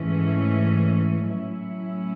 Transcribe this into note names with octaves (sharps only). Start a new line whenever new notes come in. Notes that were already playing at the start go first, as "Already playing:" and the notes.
Already playing: G#2 E3 A3 C#4
A2 F#3 C#4 E4